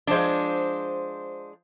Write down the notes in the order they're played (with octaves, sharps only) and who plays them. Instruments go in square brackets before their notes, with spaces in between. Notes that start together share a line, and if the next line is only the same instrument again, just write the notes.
[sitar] F3 C5 [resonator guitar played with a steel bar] G#3 D4